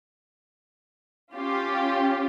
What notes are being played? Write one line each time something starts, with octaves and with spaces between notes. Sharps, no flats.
C#4 F4 G4